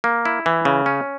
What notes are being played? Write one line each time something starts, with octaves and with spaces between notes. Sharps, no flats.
A#3
E4
E3
C#3
C#4